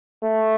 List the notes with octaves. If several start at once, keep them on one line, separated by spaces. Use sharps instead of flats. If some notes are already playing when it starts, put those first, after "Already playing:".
A3